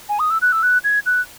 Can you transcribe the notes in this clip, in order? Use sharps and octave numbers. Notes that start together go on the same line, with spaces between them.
G#5
D#6
E6
F#6
E6
F#6
G#6
F#6